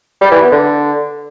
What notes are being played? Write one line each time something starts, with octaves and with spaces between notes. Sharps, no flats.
G3
E3
B3
D3